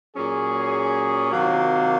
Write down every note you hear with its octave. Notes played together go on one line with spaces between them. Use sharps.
A#2 F#3 C#4 G#4
C3 D#3 F#3 A#3 F4